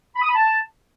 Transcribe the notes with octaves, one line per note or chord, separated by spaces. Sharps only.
B5
D#6
B5
A5